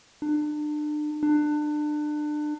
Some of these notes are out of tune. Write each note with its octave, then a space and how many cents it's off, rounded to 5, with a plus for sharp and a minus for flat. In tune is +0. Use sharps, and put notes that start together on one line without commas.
D4 +35
D4 +30